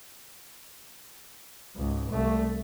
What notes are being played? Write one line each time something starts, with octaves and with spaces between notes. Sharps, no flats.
C#2 G#2
C2 A3